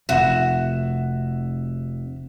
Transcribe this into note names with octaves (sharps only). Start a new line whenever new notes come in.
F1 C3 F3 F#4 E5 E7